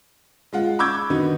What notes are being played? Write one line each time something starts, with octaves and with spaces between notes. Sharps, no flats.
G#3 F4 F#5
B5 C#6 D6 E6 G6 G#6
D3 D#3 B3 D#4 F#4 B4